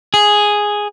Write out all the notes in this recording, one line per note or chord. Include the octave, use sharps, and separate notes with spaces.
G#4